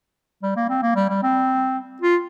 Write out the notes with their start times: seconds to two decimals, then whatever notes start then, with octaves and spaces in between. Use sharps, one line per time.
0.43 G3
0.56 A#3
0.69 C4
0.82 A#3
0.95 G3
1.09 G3
1.23 C4
2.02 F4